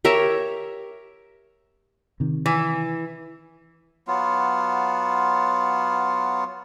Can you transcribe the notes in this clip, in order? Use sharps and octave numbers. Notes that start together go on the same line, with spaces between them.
G4 A#4 C#5 E5
C3 D#3
E3
F#3 B3 F4